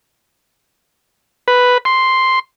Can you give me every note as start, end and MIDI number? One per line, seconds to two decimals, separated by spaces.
1.48 1.78 71
1.85 2.39 84